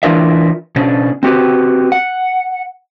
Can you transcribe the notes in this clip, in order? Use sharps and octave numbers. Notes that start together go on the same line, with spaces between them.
E3 D4 F4 A#4 D5 E5
B2 C#4 D4
C4 F#4 G4 B4
F#5